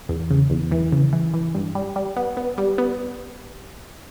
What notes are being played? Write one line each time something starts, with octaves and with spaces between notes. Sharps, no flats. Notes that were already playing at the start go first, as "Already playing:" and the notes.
E2
C#3
E2
E3
C#3
E3
E3
G2
G3
G3
B3
B3
G3
B3